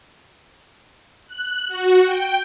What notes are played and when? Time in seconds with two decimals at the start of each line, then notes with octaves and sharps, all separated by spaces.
1.27 F#6
1.68 F#4
2.02 G5